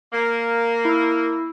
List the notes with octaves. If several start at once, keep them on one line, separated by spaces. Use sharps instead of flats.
A#3
E4 E6